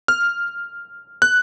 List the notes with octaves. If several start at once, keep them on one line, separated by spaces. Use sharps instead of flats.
F6
F#6